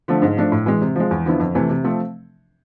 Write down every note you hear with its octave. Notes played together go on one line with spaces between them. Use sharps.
D3 F3 A3
G#2
F3 A3 D4
A2
E3 G#3
C3
F3 G#3
E2
D3 F3 B3 E4
F2
C3 E3 A3
C3
F3 A3 C4